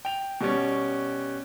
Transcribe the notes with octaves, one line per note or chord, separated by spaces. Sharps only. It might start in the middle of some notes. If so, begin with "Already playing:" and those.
G5 F7
B2 G3 C#4